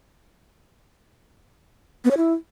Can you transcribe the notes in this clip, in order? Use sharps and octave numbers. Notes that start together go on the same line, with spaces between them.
B3
C#5
E4